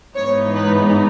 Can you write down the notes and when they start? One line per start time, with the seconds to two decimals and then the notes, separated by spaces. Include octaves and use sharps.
0.15 G#2 E3 B3 D#4 C#5
0.55 B4